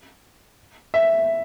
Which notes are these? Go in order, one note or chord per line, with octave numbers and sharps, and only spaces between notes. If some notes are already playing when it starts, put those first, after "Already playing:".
E5